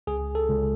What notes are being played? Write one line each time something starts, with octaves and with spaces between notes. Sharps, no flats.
C#2 G#4
A4
C#2